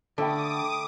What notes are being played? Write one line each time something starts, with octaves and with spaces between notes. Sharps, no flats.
D3 A3 G5 B5 D6 D#6